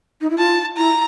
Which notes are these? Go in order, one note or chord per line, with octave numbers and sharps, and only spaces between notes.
D#4
E4
F4 A5
E4 A#5